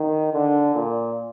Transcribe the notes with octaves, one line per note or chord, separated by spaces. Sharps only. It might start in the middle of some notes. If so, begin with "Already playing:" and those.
Already playing: D#3
D3
A#2